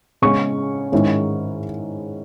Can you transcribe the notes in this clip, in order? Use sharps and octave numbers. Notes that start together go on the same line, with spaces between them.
C#3 G#3 C#4 C#6
G#2 D#3 G#3 C#4 E4